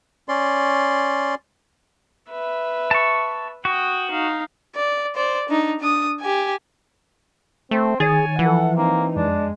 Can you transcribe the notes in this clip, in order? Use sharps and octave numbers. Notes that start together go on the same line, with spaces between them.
C#4 D5 C6
B4 E5
A5 C#6
F#4 G5 D#6
D#4 F5
D5
C5 D5
D4 D#4
D4 D#6
G4 G#5
A3 C4
D#3 G#4 C#5 G#5 A6
E3 F3 A4 F#5
A#3 C4 D#4
F2 G#3 D4